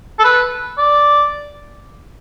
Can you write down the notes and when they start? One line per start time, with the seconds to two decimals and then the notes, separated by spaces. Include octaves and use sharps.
0.19 A4
0.24 B4
0.78 D5